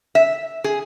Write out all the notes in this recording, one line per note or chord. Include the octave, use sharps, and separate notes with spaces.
E5
G#4